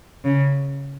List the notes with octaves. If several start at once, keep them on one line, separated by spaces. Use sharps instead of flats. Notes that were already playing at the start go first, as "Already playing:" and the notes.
C#3